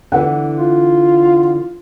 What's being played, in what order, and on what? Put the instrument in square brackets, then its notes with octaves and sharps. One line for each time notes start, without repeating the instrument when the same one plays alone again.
[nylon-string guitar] D3 E3 B3 [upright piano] F#5
[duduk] F4